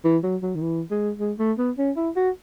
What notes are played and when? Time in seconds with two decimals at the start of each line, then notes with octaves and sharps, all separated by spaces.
0.04 E3
0.23 F#3
0.42 F#3
0.55 D#3
0.62 E3
0.91 G#3
1.19 G#3
1.39 A3
1.58 B3
1.78 C#4
1.96 E4
2.16 F#4